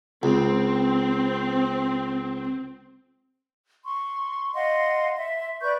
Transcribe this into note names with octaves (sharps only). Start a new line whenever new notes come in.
C#2 C4
C6 C#6
D#5 F5 F#5 C6
E5 C6
B4 D5 C#6 G6